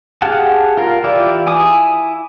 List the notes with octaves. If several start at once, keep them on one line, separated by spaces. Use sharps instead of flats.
G4 G#4 F5 F#5 A5
F4 A#4 F5
E3 E4 F4 G4 D5
E4 G#5 D6 D#6